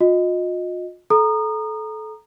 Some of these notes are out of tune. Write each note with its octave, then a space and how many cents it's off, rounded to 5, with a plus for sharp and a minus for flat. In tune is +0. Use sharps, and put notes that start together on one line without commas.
F4 +45 D#5 +0
A4 -25 A#5 +0 D#6 -30